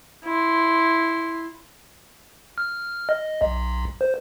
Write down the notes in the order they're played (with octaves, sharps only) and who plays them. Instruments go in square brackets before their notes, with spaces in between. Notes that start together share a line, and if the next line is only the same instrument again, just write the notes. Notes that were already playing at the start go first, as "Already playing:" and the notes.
[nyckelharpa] E4 C6
[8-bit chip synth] F6
D#5
B1
C5